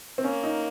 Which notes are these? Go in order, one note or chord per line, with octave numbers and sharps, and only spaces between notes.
C4
A#3 C#4
D#4